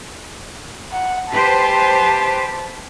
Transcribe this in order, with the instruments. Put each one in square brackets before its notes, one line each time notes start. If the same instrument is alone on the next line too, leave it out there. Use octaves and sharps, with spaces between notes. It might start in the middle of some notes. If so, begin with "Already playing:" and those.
[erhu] F#5
[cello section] G4 B4 C5 [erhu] A5